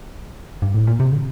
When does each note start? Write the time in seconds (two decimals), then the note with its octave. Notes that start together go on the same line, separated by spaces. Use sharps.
0.62 G2
0.74 A2
0.87 A#2
1.00 C3
1.12 D3